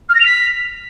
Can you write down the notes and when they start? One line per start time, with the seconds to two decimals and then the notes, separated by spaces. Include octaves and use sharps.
0.09 F6
0.14 A#6
0.20 F7
0.25 B6